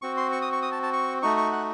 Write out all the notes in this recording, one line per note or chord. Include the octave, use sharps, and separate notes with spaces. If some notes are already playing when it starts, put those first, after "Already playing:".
C4 F#4 C#6
C6
C#6
D#6
C#6
D#6
A5
A5
C#6
A3 D#4 F#4 C#6
C#6
F#5